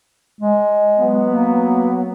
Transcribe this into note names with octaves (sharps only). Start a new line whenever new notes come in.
G#3
F#3 B3
A#3